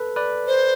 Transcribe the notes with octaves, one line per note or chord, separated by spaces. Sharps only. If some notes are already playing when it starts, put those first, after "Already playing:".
Already playing: A4 B4
B4 D5
C5